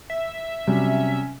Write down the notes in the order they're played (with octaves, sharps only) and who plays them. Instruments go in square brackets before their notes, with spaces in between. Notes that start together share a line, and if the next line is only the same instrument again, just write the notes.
[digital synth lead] E5
[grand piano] C3 F#3 G3 [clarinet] C#4